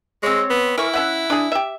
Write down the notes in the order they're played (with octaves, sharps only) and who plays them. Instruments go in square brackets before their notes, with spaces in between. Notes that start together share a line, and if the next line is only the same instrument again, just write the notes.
[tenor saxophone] G#3 [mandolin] C4 C#5
[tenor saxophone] B3
[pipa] E3 [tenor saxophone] E4 [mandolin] A#4 C#6
[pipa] C#4 E5 F#5 [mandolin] F#6
[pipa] D4 G#4
G4 E5